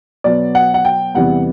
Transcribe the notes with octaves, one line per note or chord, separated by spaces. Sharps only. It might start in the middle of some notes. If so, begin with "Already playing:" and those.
B2 F#3 B3 D5
F#5
F#5
G5
E2 C3 E3 G3 B3 F#5